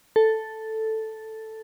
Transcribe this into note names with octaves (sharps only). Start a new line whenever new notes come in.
A4